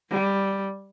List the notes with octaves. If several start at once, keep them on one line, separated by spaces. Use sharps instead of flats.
G3